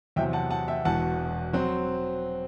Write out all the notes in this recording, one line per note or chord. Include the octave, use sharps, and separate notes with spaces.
E2 C3 F#3 E5 G5
F#5 A5
F#5 A5
E5 G5
E1 E2 B2 F#5 A5
F#3 C4